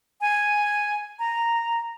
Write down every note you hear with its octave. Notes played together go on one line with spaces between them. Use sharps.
G#5
A#5